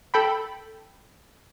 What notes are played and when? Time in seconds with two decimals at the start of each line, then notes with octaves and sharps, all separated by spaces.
0.14 A4 G5 B5